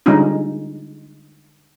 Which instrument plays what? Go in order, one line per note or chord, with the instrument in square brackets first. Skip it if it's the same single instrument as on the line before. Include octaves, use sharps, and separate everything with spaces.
[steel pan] D3 G3 G#3 C#4 D#4 F4